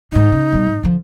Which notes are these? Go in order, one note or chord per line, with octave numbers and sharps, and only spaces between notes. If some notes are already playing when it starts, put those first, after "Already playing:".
G#2 D#3 D#4
C#3
B1 G3
G#2
D3 F3